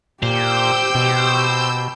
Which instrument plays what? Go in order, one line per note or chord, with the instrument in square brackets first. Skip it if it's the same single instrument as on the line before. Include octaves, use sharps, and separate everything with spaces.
[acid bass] A#2 [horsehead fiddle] G4 G5 [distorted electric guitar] C5 [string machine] E6 G6
[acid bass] B2